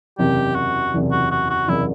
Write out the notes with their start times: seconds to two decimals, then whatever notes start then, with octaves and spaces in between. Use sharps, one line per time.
0.18 F#1 E2 C3 G4
0.55 F#4
0.93 F#1 E2 C3
1.11 F#4
1.31 F#4
1.50 F#4
1.68 F#1 E2 C3 E4